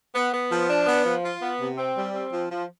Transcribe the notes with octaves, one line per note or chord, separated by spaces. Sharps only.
B3
B3
F3
D4
B3
F3
F4
B3
C3
C4
G3
C4
F3
F3